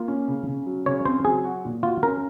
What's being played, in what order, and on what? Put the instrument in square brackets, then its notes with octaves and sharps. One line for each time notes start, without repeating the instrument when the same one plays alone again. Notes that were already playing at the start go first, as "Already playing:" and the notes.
Already playing: [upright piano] A#3 [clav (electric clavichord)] F4
[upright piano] C#4
C#3
C#3
F#3
[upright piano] C#3 [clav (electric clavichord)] C#5
[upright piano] C4 [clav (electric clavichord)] C5
[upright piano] F#3 [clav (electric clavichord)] G#4
[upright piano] F#4
A#2
[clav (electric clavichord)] F4 [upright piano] F#4
[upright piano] C#4 [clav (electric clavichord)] A#4